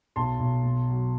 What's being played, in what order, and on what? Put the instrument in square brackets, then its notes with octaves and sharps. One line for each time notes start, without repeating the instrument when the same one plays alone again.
[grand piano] B1 A5 C6
B1
B2
F#3